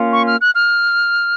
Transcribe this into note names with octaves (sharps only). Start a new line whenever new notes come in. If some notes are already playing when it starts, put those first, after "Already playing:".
Already playing: A#3 C#4 F4
C#6
F6
F#6
F6